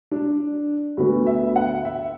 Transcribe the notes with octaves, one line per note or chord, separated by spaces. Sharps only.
D4
D2 D3 B3 F#4
E5
F#5
E5